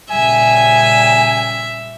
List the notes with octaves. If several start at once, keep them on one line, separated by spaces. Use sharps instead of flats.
A#2 C#3 G3 E5 G#5